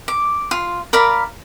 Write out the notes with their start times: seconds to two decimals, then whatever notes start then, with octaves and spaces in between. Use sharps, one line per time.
0.08 D6
0.51 F4 C6
0.93 A#4 D5 F5 B5